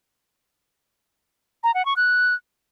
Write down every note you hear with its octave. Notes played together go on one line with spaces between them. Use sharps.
A#5
F#5
C#6
F#6